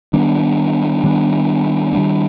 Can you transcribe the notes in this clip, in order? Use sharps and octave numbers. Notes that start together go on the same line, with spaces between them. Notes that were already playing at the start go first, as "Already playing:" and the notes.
D#3 G3 B3 D4
D#3 G3 B3 D4
D#3 G3 B3 D4